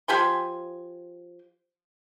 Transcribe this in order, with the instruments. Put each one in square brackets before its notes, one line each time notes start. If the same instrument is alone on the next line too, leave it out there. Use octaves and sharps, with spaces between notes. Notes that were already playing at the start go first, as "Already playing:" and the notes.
[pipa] F3 G4 G#5 C6